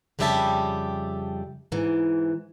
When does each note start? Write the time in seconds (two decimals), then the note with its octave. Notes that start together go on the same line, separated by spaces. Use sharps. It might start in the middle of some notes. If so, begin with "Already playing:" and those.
0.19 F2 C#3 G3 G4 E5 A5
1.72 G#2 E3